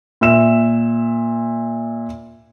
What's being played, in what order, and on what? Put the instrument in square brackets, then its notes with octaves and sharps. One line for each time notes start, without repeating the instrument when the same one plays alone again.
[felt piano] A#2 E5 E7